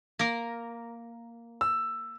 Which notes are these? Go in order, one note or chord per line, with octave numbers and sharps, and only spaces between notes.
A#3 A#4
E6